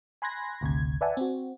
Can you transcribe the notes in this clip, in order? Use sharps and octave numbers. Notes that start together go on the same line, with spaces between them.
G#5 B5 C6 F#6 G#6 A#6
G#1 D2 C3 G#6
B4 D5 E5 F#5 G#5 A5
C4 F#4